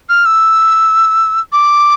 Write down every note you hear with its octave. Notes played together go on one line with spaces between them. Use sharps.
F6
E6
D6